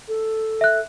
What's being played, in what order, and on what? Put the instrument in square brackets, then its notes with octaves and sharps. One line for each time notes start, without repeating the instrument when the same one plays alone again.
[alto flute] A4
[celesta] E5 F#6